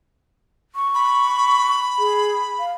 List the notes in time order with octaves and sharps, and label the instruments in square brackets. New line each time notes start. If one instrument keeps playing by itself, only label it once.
[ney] C#6
[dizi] B5
[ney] G#4
F5